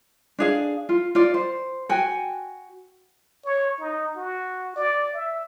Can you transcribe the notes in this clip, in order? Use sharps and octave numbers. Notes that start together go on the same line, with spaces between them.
D4 G#4 F5
F4
F4 D5
C5
F#4 G5 G#5
C#5
D#4
F#4
D5
E5